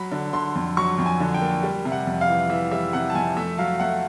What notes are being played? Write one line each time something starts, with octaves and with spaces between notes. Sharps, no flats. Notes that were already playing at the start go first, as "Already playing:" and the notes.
Already playing: F#3 B5
D3
D3 C6
F2
F#3 C#6
F2
G#5
D3
G5
A#3
G3
C3
F#5
F2
F5
E3
E3 E5
G3 E5
C3 F#5
A5
F2 G#5
A3 E5
F#3 F5
A3 F#5